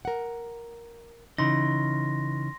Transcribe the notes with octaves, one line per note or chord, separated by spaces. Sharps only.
A#4 F#5
C#3 E3 D#4 C6 A#6